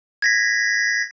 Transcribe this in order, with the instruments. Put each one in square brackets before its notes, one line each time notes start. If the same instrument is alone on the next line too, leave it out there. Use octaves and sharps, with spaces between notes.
[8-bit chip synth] G#6 A#6 B6